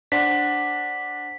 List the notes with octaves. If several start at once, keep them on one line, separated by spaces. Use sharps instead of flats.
D4 C5 F#5 C6 B6